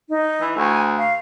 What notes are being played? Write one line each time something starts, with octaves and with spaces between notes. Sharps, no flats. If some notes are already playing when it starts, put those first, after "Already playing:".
D#4
E3
D2 G#5
F5